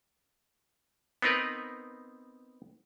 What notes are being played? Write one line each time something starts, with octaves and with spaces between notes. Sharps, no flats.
B3 C4 D#4 A#4 B4